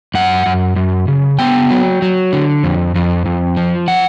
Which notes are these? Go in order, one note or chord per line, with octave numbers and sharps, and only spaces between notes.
F#2 F#5
F#2
F#2
C#3
B3 G5
F#3
F#3
D3
F2
F2
F2
F3
F#5